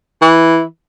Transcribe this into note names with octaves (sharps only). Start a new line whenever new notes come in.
E3